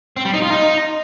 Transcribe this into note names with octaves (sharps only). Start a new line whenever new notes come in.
C4
G3
D#4
F4
D#4